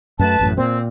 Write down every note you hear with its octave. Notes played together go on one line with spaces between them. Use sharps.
F#2 G#3 A3 B4 A5
A1 F#2 A2
A#2 C4